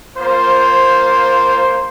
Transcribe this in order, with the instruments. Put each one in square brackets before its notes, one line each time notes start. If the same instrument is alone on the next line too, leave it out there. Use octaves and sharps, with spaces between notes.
[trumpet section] A#3 F4 C5